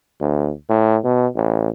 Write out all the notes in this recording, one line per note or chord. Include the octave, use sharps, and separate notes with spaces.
D2
A2
B2
A1